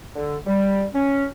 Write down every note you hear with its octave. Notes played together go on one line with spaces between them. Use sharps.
D3
G3
C#4